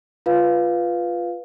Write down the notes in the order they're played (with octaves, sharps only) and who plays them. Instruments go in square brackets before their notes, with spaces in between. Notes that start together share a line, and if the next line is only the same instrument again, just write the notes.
[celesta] F4 B4 F5